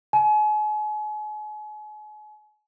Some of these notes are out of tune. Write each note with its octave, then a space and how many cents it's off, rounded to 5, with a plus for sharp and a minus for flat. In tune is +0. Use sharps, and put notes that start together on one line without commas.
G#5 +40